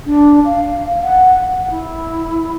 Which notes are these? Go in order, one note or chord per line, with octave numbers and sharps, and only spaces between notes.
D4
F5
F#5
F#5
E4